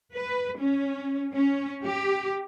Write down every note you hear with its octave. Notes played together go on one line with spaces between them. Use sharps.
B4
C#4
C#4
G4